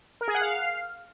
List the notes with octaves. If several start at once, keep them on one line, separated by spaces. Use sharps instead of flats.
A#4
G#4
F#5
F5